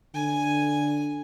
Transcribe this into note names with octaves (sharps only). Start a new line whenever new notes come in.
D3 G#5